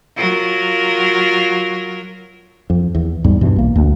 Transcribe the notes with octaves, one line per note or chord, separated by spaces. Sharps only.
F#3 F4 A#4
F2
E2
E2 G#2 G3
G2 B2 E3
B1 A#3
D2